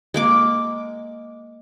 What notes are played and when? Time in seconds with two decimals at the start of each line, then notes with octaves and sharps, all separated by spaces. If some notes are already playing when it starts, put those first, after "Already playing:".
0.14 G#3 A#3 D6